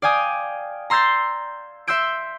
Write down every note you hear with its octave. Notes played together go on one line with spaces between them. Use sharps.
D5 F5 G5 G#5 D#6
A#5 C6 E6 G6 A6 C7
E5 C6 E6 G6 D7